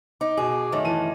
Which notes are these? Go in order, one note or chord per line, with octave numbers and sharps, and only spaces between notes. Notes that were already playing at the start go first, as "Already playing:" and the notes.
D#4 D6
B2 G#4
F#2 D#3 A3
E3 A5 D#7